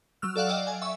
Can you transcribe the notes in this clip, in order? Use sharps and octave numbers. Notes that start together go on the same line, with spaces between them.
F#3 E6 F6
A4 D5 F5 F#5
D5 D#5 F5 G5
G#5
E5 C#6